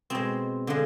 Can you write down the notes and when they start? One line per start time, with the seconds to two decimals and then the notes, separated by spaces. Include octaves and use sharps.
0.10 B2 G#3 C4
0.67 D3 F3 G#3